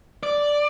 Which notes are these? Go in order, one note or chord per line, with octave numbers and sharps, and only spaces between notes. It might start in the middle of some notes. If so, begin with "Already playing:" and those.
D5